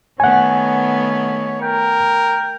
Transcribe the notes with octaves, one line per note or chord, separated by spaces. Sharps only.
D#3 A3 B3 C#5 F#5 G#5
A#4 G5